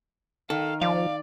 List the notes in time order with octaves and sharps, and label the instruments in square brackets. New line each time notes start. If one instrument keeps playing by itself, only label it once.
[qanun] D#3 [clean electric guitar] A4 [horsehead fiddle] F5
[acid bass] F3 [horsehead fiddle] D5 [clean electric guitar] F5